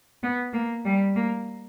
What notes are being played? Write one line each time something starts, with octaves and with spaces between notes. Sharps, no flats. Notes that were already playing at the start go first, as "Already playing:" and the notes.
B3
A#3
G3
A#3